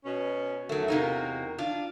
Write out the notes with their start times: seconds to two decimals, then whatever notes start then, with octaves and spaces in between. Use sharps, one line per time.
0.05 B2 C#4
0.69 E2 F#3 A3 F#4 A#4
0.88 C3 A#3 D#4
1.58 D4 F4